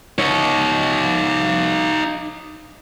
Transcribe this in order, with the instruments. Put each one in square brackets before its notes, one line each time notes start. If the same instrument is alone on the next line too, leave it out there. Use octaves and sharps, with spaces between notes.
[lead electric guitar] D#4 C#5